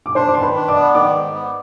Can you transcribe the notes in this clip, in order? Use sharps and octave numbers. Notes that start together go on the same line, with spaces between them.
D6
D4 C5 C6
D6
D#3 C6
B4 B5
D4
D5 D6
B3
D#3 D5 D6
G#2
B3